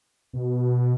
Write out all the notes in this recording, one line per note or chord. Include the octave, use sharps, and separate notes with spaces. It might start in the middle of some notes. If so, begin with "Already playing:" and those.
B2